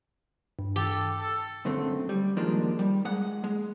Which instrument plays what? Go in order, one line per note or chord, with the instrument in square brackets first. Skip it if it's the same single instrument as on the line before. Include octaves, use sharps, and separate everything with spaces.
[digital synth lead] G2
[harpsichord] G4 [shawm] A4
[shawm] A4
[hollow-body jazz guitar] C#2 F#2 D3 A3 C4
G3
D#3 F3 G#3 A#3 D4
G3
G#3 F#5
G#3